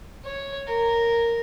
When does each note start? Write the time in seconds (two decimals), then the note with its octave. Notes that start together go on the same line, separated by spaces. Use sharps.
0.24 C#5
0.67 A#4